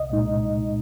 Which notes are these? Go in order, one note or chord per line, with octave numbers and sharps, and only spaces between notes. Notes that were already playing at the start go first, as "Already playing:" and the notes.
Already playing: C2 D#5
A#2 G#3 D#4